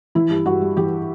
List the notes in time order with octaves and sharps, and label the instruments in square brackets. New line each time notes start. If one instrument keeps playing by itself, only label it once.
[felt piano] E3 E4
G2
G2 F#4
G3
E3 G4